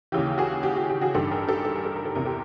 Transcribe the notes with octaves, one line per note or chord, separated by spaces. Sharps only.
D#2 C#3 E3 G4
F#4 G#4
G4
F#4
G4
F#4 G#4
A1 G2 D#3 G4 A4
G#4 A#4
G4 A4
A4
A#4
A4
A#4
A4
E2 C3 E3 A#4
G4 A4